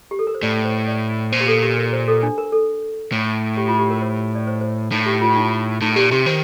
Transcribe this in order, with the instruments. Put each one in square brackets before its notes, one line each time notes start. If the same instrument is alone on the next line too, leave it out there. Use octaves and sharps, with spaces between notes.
[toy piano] G4
A4
A#4
C5
[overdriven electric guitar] A2 [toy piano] D5
[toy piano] C5
D5
[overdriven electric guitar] A#2 [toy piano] C5
[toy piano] G4
A4
G4
A#4
C5
A4
D4
A#4
A4
[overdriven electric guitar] A2
[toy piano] G4
F4
G4
A#4
C5
D5
C5
C5
[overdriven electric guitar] A2 [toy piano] D#4
[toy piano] G4
F4
D#4
[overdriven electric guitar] A2 [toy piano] D#4
[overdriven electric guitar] A#2 [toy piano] G4
[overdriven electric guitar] C3 [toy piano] G4
[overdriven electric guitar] D#3 [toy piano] C5